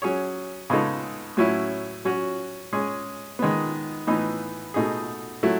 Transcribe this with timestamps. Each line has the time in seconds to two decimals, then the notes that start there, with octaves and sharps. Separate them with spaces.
0.02 F#3 C#4 G#4 C#5
0.70 C#3 G#3 B3 D#4 A4
1.37 A2 F#3 C#4 E4
2.05 F#3 C#4 F#4 C#5
2.73 G#3 C#4 G#4
3.39 D#3 G#3 B3
4.07 A2 E3 B3 D#4
4.74 B2 A3 D#4 G#4
5.43 F#3 A3 E4